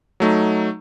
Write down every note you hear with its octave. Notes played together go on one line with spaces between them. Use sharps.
F#3 A3 D#4